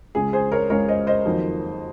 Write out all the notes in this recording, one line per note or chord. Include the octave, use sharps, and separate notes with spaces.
C#2 C#3 G#3 G#4
G#4 C5
A#4 C#5
C#2 C#3 G#3 A#4 C#5
C5 D#5
C5 D#5
F2 D#3 F#3 A#3